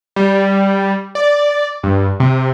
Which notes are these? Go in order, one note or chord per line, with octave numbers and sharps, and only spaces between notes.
G3
D5
G2
C3